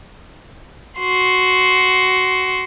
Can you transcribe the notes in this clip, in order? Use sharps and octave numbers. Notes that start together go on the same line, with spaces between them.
F#4 C6